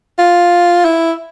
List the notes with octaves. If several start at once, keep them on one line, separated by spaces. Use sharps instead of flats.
F4
E4